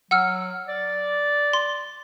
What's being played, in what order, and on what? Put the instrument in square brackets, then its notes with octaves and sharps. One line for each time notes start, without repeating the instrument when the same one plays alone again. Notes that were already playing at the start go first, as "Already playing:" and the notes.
[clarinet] F#3 [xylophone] F#5 E6 F6
[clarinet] D5
[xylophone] C6